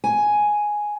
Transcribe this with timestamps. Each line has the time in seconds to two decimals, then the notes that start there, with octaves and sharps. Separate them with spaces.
0.04 G#5